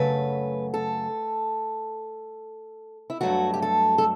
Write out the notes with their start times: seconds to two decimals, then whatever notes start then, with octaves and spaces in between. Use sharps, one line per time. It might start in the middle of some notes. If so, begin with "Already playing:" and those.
Already playing: F#2 C#3 F#3 A3 B4
0.74 A4
3.10 E4
3.21 G2 F#3 A3 F#4
3.54 G4
3.62 A4
3.98 A4